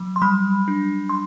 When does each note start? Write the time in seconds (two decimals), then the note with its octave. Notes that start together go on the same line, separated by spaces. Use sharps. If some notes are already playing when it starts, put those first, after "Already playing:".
Already playing: F#3
0.16 C6
0.22 G3 B5
0.68 D4
1.09 C6